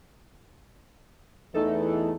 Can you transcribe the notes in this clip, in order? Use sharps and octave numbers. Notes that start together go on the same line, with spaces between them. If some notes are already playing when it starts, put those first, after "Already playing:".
E2 E3 A3 D#4 A4